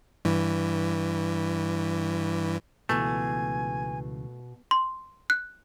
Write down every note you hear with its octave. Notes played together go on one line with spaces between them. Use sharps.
G2 E3
C#2 B2 E3 A3 G#5 A5
C6
F#6